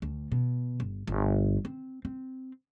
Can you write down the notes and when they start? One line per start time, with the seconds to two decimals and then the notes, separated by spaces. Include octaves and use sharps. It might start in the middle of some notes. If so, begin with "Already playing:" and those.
0.02 D2
0.32 B2
0.80 G1
1.07 G1
1.65 C4
2.05 C4